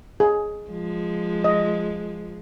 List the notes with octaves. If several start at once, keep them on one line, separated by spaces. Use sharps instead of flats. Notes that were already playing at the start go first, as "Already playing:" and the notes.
G#4
F3 G#3
D#5